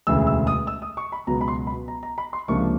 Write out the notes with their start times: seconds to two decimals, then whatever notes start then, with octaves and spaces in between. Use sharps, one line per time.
0.07 E1 D2 C#3 E3 A3 E6
0.27 E6
0.47 D#6
0.67 E6
0.82 D#6
0.97 C#6
1.12 B5
1.27 C#2 B2 F#3 B3 A#5
1.41 B5
1.48 C6
1.67 B5
1.88 A#5
2.03 A#5
2.18 B5
2.33 C6
2.48 C#2 C3 F3 A#3 D4 C#6